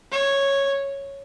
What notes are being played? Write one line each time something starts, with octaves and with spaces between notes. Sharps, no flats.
C#5